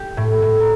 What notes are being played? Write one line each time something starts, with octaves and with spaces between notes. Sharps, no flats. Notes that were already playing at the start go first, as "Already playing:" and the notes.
Already playing: G4
A2
A2
A#4